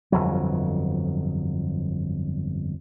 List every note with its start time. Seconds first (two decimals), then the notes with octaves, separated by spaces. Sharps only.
0.12 G1 F2 F#3